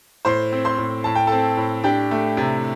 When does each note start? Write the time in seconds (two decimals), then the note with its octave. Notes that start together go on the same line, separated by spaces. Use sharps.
0.25 A2 C5 C6
0.52 C4
0.65 C5 C6
0.78 A2
1.04 A2 A5
1.15 G5
1.27 C4 A4 A5
1.57 A2
1.84 D4 G4 G5
2.11 A3
2.37 C3